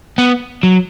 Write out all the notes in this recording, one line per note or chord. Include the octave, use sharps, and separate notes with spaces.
B3
F#3